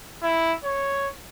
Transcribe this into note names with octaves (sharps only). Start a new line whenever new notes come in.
E4
C#5